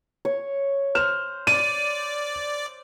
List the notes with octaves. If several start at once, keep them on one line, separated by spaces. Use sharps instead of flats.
C#5
C5 F6 E7
D5 D#7